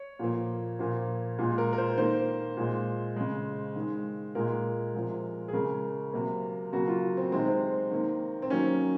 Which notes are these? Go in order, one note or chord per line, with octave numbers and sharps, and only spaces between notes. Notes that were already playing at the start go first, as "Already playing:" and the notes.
Already playing: C#5
A#2 F3 A#3
A#2 F3 A#3
A#2 G#3
A#4
A#4
C5
D#3 A#3 C5
A#2 G#3
C#3 G#3
D#3 G#3
A#2 G#3 A#4
C3 F3 G#3
G#4
C#3 G#3 A#4
C3 F#3 A#3
C#3 F#3 A#3 F#4
F4
C4
C3 D#3 G#3 C4
C4
D#3 A#3
C4
D#3 F#3 A#3 C#4